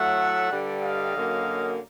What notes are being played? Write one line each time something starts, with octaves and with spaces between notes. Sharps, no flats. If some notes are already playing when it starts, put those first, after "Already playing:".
Already playing: A2 F#3 A3 E5 F#5
G2 D3 G3
D#5 F5
F#2 D3 F#3 A#3